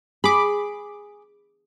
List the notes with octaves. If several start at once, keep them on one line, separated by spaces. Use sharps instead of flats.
G#4 B5 D6